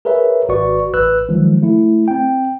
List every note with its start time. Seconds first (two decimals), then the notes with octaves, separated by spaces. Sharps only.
0.05 G#4 A#4 B4 C#5 E5
0.49 G#1 F#4 B4 D5 C#6
0.94 A1 B4 E6 F#6
1.29 D#3 F3 F#3 G#3
1.62 A3 E4
2.08 C4 G5